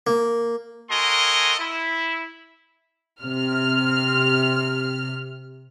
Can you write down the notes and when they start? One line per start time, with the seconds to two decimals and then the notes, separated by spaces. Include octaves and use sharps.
0.07 A#3
0.90 F#4 A4 A#4 D#5 G#5 C6
1.59 E4
3.23 C3 F6